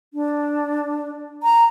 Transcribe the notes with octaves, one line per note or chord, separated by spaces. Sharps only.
D4
A#5